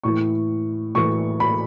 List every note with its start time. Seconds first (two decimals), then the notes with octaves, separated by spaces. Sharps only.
0.03 A2 E3 C#6
0.95 A2 E3 C#6
1.40 B5